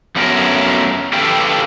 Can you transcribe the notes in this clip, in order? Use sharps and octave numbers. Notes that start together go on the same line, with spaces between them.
F#2 A3 B3 C#4 F4 A#4
G4 A4 B4 F5 G5